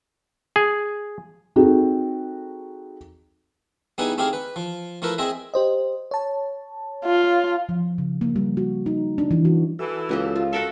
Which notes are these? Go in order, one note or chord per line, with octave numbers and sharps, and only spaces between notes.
G#4
C4 D#4 F#4 G#4 A4
G3 B3 D#4 E4 G#4 B4
A3 C4 D#4 G4 G#4 F5
B4
F3
F3 A3 E4 A#4 B4
C4 G#4 C5 D#5 E5
G4 C5 D#5
C#5 A5
F4
F3
C#3
A#3
G3
F#4
D#4
D4
E3
F#4
E3 F#4 A4 E6
C#2 A#3 G4 D#5
F4
F#4 A4 A#4 E5